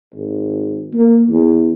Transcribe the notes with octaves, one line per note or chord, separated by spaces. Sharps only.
G#1
A#3
E2